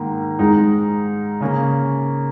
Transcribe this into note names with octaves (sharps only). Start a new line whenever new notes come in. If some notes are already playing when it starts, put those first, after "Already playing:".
Already playing: G#2 D#3 A#3
G#2 G#3 D#4
C#3 A#3 C#4